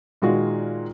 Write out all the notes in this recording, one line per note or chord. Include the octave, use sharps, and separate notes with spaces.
A#2 D#3 G#3 F4 F#4